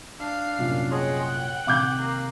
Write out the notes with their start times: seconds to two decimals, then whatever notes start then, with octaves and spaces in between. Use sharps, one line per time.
0.19 D4 F5
0.58 C2 F#2 A#2
0.91 G#4 C#5 D#5 F#5 G5 C6
1.26 F#6
1.67 C3 D#3 F5 D6 G6
1.98 A#3 G4